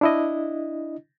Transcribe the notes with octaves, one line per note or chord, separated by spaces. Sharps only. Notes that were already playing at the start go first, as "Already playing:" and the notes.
D4 E4 D#5